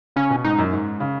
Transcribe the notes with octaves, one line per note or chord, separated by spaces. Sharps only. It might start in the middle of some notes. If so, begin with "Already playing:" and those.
C#3 C#4
B2
G#2 D#4
F#2
G#2
C#3